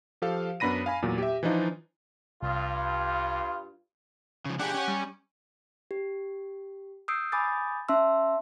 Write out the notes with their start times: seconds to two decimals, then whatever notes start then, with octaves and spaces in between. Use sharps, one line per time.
0.22 F3 G4 A4 F5
0.60 F#2 B3 D4 B5 A#6 D#7
0.86 F5 G#5 B5
1.02 E2 A#2 F#3
1.18 G4 E5
1.43 E3 F3 D4 D#4 F4
2.42 C2 G2 F4
4.45 C#3 F3
4.59 D4 G4 G#4 F#5
4.74 C#4 C#5
4.88 G3
5.91 G4
7.08 D#6 E6 G6 C7 D7
7.32 G#5 B5 D6 D#6 G6 A6
7.89 C#4 E5 A5 C6 E6